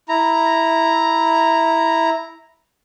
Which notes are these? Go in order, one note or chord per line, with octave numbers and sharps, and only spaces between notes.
E4 A#5